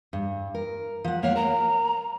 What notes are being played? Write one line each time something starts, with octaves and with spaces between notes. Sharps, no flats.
G2
A#4
F3 F#5
A#3 C#5 F5 F#5
A#4 A#5